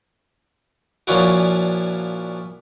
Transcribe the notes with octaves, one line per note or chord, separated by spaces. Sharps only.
A#2 F3 C#4 D4 E4 F#4